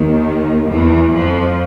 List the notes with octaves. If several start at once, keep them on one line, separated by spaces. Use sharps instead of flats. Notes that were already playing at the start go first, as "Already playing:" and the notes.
Already playing: D#2 D#3
E2 E3
F2 F3